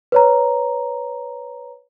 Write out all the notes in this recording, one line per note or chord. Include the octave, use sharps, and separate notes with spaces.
B4 C#5 A#5